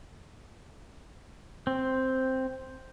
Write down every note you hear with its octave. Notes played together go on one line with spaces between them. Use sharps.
C4